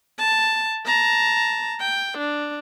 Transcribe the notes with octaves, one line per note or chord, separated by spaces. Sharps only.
A5
A5 A#5
G5
D4